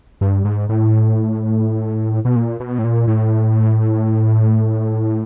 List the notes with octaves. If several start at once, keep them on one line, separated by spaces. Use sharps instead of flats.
G2
G#2
A2
B2
A#2
B2
A2
A#2
A2